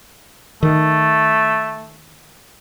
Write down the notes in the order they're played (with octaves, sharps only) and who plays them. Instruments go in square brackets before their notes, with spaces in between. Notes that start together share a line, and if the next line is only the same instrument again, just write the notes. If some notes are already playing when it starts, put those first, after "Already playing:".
[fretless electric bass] D#3 [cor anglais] A3